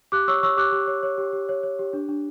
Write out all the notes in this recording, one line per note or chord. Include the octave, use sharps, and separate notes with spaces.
G4 D6 F#6
C#5 C#6 E6
C#5 C#6 E6
G4 D6 F#6
G4
C#5
C#5
G4
G4
C#5
C#5
G4
D4
D4